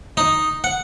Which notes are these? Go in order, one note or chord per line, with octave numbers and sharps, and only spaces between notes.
D#4
F#5